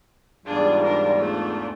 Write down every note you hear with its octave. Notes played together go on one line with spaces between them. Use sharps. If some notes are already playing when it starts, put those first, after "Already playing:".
E2 G#2 G3 D4 F4 G#4
D4 A#4
A3 D4